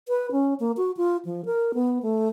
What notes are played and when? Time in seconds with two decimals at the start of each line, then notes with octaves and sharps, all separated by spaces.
0.08 B4
0.31 C#4
0.60 A#3
0.77 F#4
0.97 F4
1.25 F3
1.45 A#4
1.74 B3
2.02 A3